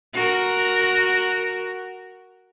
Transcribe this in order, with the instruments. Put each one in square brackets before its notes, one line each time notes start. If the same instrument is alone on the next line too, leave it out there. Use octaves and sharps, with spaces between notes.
[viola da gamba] F#4 A#4